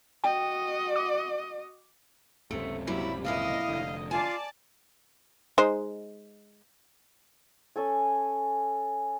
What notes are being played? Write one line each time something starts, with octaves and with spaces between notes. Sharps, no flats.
F#4 D#5 G5
D6
F#1 C#2 C3 A3
A#2 F#3 G3 E4 B5
F2 A#2 E4 D#5 F5
F1 D3
F4 D5 G#5 A5
G#3 D#4 C5
C#4 A4 G#5